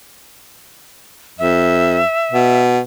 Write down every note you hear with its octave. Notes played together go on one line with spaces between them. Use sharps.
F2 E5
B2